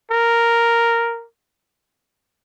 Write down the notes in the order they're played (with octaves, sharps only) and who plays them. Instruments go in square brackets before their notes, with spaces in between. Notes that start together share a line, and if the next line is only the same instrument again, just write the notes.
[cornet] A#4